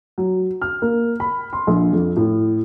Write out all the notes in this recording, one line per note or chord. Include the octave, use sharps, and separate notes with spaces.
F#3
F6
A#3
B5
C6
A#1
F2
A2